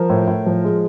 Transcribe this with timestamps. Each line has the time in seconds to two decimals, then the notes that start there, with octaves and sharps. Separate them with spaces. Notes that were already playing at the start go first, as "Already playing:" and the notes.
Already playing: F3 A#4 C5
0.10 A2
0.28 A2
0.46 F3
0.64 G#3